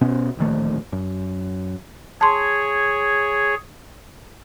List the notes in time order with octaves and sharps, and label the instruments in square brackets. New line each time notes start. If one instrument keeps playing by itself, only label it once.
[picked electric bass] B2 B3 C#4
D1 A#1 D#3 A3
F#2
[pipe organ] G#4 C#5 [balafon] A5 C6